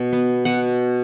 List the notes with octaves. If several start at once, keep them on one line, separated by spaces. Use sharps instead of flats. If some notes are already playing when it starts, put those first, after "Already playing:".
Already playing: B2
B3
B2 F#5